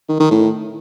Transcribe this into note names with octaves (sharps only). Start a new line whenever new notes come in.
D#3
D#3
A2